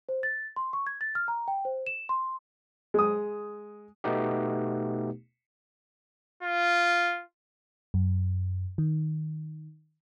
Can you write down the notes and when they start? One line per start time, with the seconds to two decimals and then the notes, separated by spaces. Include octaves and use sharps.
0.09 C5
0.23 A6
0.56 C6
0.73 C#6
0.87 G#6
1.01 A6
1.15 F6
1.28 A#5
1.48 G5
1.65 C5
1.87 E7
2.09 C6
2.94 G#3 D#6
4.04 B2 A3 B3 D#4 G4
6.43 F4
7.94 F#2
8.78 D#3